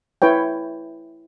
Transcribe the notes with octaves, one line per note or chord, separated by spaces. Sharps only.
E4 B4 C#5 G5